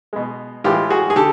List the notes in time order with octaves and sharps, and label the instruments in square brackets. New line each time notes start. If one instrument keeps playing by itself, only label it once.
[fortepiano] B2 G#3
A2 E3 G#3 F4 G4
F#4 G#4
G#4
D3 G4 A4